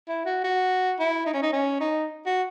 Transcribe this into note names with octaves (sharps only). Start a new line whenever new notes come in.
E4
F#4
F#4
E4
D#4
C#4
D#4
C#4
D#4
F#4